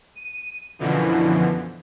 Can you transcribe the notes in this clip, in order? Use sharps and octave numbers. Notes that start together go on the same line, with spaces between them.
D#7
F#2 B2 D3 E3 F3